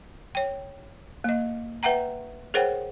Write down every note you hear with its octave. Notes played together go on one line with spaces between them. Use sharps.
C#5 G5
A#3 D#5
B4 E5 F#5 G5 A#5
G#4 A#4 C5 C#5 F#5 G5